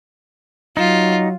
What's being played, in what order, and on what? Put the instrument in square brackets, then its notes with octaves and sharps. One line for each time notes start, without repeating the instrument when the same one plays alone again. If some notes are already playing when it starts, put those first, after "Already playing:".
[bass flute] F#3 [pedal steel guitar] D#4 [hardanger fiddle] F4